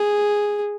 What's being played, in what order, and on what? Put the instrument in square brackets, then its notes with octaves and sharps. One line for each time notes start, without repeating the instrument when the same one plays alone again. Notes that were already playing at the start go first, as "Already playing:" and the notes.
Already playing: [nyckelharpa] G#4